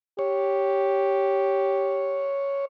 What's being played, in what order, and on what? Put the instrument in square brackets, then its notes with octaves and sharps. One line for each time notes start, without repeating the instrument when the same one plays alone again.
[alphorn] G4 [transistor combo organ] C#5